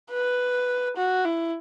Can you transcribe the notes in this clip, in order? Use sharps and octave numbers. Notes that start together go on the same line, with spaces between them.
B4
F#4
E4